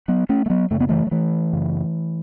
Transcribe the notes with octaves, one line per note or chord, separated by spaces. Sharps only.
F#3 B3
A3 C#4
A3
F#3 B3
F#2 C#3 A3
B3
E3 A3
F#3
E3 A3
F#2 C#3